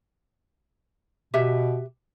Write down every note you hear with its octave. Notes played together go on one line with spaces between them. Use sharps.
B2 G4 B4 E5